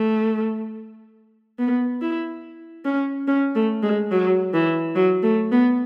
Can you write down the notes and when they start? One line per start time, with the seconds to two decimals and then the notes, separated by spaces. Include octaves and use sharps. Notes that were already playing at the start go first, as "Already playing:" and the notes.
Already playing: A3
1.59 B3
2.02 E4
2.85 C#4
3.28 C#4
3.55 A3
3.83 G#3
4.11 F#3
4.53 E3
4.96 F#3
5.23 A3
5.52 B3